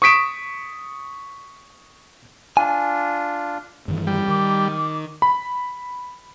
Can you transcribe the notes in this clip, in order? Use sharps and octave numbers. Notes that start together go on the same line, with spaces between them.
C#6 D#6 B6 D7 E7
D4 F4 G#5
G2 D#3 E3
G3
D#3 D6
B5